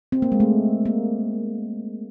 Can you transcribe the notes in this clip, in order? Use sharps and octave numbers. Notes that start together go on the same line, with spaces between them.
C4
A#3
G#3
A3
A#3